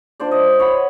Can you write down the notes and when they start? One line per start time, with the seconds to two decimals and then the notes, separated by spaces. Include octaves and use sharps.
0.20 D4 F4 C5 D5
0.31 D#5
0.60 C#5 F#5 B5